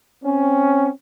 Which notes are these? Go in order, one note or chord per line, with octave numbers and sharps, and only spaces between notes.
C4 C#4